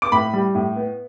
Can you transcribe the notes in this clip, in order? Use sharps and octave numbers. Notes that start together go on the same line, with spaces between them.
D6
A2 B5
G3
A2
B3